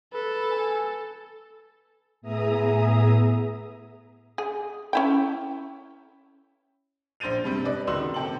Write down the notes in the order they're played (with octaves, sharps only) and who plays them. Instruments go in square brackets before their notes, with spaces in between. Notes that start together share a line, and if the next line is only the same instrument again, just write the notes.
[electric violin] A4 [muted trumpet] B4
[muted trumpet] G#5
[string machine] A2 B3 G#4 E5 A#5 D#6
[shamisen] G#4
C#4 E4 G5
[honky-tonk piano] A#1 C5 G6 A6 D#7 F7
G2 C3 G3
B4 D5 D#5
C#2 D#3 F#4 C6 E6 F#7
D#3
C3 A4 G5 A5 F#7